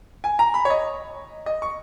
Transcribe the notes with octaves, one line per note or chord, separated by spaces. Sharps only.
G#5
A#5
B5
C#5
D#5
D#5
C#6